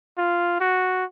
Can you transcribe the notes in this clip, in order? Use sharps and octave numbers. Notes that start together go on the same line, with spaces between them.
F4
F#4